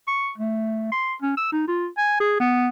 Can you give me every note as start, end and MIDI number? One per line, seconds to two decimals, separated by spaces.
0.07 0.30 85
0.38 0.90 57
0.92 1.14 84
1.22 1.33 61
1.37 1.51 88
1.52 1.65 63
1.68 1.87 65
1.98 2.19 80
2.20 2.36 68
2.40 2.68 59